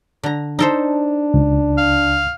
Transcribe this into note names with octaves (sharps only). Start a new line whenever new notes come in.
D3 A#5
D4 D#4 A4 C5
C#2
F5